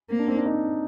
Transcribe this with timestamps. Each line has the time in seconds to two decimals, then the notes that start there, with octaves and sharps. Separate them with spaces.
0.10 A#3 C4
0.19 D4
0.28 C4 D#4
0.37 D4
0.45 C4 D#4